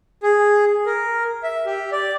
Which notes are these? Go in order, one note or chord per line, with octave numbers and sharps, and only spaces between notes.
G#4
A#4
E5
G4
D5